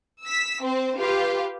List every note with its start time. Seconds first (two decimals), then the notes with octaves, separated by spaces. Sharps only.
0.23 E6 B6
0.62 C4 C5
0.98 F4 G4 B4 F5